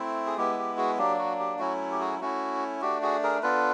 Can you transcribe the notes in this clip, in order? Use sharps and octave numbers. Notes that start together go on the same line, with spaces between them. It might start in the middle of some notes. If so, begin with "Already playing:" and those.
Already playing: A3 C4 E4
G#4
G#3 B3 E4 G4
G4
F#4 G#4
F#3 A#3 D4 G4
F#4
G4
F#3 A3 C#4 E4 F#4
G4
F#4 G#4
A3 C#4 E4 F#4
A3 D4 F#4 G4
F#4 G#4
G#4 A#4
B3 D4 F4 A4 B4